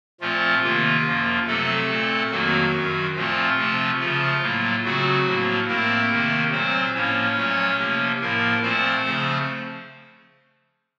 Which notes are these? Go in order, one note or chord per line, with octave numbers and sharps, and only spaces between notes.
A#2 F3 A3 C4 F4
C3 D#3 A#3 F4
F#2 F3 A#3
C3 F#3 A3 C4 A4
A#2 A3 C4
F2 D#3 F#3 A#3 F#4
F#2 D#3 F#3
A#2 F3 A3 C4 F4
C3 F3 A3 C4
C#3 F3 A3 F4
A2 F#3 A#3
C#3 F#3 A3 C4 F#4
A2 F3 A#3
A2 A3 A#3 C4 A#4
C3 D#3 A3 C4
A#2 F#3 C4 C5
A2 F3 A#3 C#4 C#5
A#2 F#3 A3
C3 F3 A#3
A2 F3 A#3 A#4
A#2 F3 A3 C4 C5
C#3 F3 A3 C4